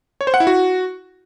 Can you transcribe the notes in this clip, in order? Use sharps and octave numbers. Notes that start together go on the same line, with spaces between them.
C#5
C5
F#5
E4
F#4